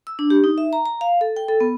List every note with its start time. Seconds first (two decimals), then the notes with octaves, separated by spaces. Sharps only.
0.07 E6
0.19 D4
0.30 G4
0.44 D#4
0.58 E5
0.73 A#5
0.86 A#5
1.01 F5
1.21 A4
1.37 G5
1.48 A4
1.61 B3